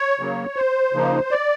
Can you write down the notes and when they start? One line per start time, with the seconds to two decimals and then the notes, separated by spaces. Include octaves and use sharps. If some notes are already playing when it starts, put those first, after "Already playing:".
Already playing: C#5
0.19 C#3 F#3 A#3
0.56 C5
0.93 C#3 F3 A#3 D#4
1.31 D5